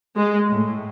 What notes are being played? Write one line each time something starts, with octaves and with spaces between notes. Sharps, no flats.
G#3
A2